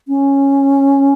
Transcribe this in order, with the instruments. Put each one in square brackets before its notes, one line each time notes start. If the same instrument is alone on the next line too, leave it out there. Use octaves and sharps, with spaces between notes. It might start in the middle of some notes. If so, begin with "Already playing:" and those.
[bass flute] C#4